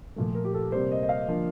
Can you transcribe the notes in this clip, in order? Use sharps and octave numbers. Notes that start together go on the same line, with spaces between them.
A#2 F3 A3
A#4
G4
A4
C3 G3 A#3 C5
D#5
D#5
F5
D3 F3 A#3